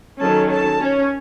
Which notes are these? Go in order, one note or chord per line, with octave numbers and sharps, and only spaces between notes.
D#3 F#3 C#4 A4 A5
A4 A5
C#4 C#5